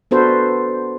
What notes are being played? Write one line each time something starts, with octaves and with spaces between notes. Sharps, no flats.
B3 D4 F#4 A4 B4 C5